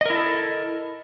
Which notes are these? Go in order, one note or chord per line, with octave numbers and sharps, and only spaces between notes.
E4 A4 A#4 D#5